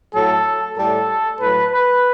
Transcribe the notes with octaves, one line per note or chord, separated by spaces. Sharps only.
A2 F#3 A4
A2 G3 A4
A2 F#3 B4
B4